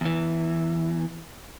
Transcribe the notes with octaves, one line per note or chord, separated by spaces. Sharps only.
E2 E3